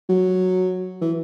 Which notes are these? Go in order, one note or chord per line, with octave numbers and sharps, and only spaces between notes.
F#3
E3